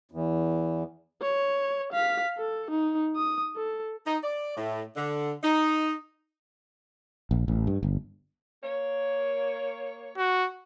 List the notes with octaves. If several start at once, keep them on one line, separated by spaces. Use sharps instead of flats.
E2
C#5
F5 B6
A4
D#4
D#6
A4
D#4
D5
A2
D3
D#4
A#1
A1
G2
G1
A#3 C#5
F#4